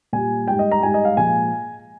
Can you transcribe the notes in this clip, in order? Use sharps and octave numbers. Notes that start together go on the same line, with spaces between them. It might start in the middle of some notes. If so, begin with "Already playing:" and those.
A#2 G3 G#5
G#2 G3 G5
D#5
A#5
G#2 G3 G#5
D#5
F5
A#2 F3 G#3 G#5